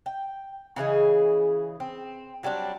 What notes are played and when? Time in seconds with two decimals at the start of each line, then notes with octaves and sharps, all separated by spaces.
0.06 G5
0.76 C#3 E3 G#4 D#5
1.80 C4
2.43 F#3 G3 C4 D4